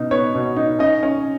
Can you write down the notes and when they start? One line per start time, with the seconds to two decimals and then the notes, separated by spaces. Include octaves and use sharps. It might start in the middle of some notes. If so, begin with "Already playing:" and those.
Already playing: B2 D#4
0.11 B3 C#5
0.35 B2
0.56 D#4
0.79 C#4 D#4 D#5
1.03 C#4